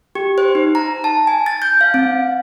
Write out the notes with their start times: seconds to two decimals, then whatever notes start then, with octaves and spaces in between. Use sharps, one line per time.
0.15 G4
0.38 C5
0.55 D#4
0.75 A#5
1.04 A5
1.27 G#5
1.46 A6
1.62 G6
1.81 F5
1.94 C4